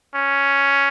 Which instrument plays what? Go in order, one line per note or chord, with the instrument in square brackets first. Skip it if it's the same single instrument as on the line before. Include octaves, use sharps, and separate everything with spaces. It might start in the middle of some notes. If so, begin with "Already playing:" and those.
[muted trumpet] C#4